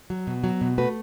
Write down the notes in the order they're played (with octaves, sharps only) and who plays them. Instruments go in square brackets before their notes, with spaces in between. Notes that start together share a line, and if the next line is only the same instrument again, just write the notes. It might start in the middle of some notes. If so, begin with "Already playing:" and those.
[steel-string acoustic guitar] F#3
B2
F#3
B2
A3 F#4 B4